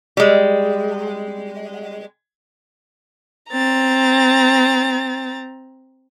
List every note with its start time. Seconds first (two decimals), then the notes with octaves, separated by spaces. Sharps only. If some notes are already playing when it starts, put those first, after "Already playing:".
0.17 G3 G#3
3.52 C4 A#5 A6